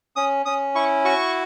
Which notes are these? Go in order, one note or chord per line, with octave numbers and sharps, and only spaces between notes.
C#4 D#6
C#4 D#6
E4 C#6
F#4 C#6